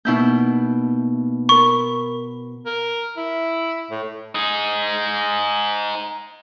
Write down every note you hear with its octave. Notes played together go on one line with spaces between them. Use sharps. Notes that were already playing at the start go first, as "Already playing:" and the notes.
B2 A#3 D#4 E4 G6
A#4 B5 C#6
A#4
E4
A2
D#4 G#4